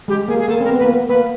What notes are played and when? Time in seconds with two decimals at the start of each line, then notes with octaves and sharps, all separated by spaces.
0.08 G#3 G4
0.28 A#3 G#4
0.39 G#4
0.48 A#3 A4
0.61 C4
0.64 A#4
0.69 B3
0.79 A#3 B4
0.89 B3
1.09 A#3 B4